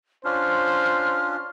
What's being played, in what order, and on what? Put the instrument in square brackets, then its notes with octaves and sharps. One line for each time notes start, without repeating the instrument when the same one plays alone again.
[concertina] C#4 D4 F4 [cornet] C5 [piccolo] F6